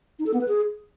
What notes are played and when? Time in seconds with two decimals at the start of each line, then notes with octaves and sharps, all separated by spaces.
0.19 D#4
0.26 A4
0.34 B3
0.41 B4
0.48 G#4